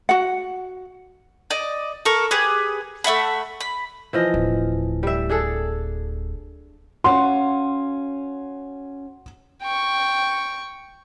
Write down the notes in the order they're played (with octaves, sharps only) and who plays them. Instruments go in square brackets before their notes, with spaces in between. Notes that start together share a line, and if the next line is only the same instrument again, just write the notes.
[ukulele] F#4 F#5
[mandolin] D5 D#5
A4 A#4 C#6
G4 G#4 B4
A3 E5 F#5 B5
B5
[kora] E3 F3 D#5
[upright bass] D1
[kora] G3 E5
D4 G#4 A4
[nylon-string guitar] C#4 F#4 F5 [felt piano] F#5 C6
[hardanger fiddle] G5 C#6